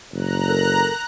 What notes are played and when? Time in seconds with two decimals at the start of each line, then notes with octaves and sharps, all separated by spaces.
0.14 F#1 A#5 F#6
0.49 A4 A#4